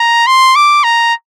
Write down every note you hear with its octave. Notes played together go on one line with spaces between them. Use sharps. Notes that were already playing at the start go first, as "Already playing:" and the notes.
Already playing: A#5
C6
D6
A#5